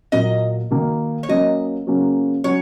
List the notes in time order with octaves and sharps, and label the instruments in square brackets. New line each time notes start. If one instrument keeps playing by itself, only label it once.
[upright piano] A#2 F#3 A#3 [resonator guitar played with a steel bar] D#5
[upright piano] D#3 A#3 F#4
[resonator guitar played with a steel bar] C#5
[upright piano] F#3 A#3 C#4 [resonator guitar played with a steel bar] D#5
[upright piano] C#3 F#3 A#3 C#4 F#4
[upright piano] F#3 C#4 F#4 [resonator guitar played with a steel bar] C#5